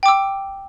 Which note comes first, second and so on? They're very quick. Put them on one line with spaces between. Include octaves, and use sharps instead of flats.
G5 D6 E6